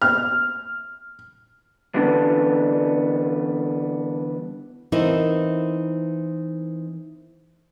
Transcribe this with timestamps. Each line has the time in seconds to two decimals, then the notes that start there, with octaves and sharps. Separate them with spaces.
0.02 F6
1.94 D3 E3 G3 B3 D4
4.92 E3 B3 C4 D#4 E4 A#4